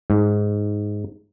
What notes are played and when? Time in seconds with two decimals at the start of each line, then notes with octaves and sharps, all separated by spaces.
0.10 G#2